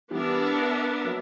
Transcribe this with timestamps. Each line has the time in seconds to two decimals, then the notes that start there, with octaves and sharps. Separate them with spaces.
0.11 E3 G3 B3 D4 A#4 E5
1.05 F#3 A#3